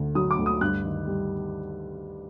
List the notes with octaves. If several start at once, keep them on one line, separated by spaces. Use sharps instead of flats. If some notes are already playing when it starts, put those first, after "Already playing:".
Already playing: D2 D3
F#3 D#6
D6
D2
D#6
G2 F#6
D#3
G3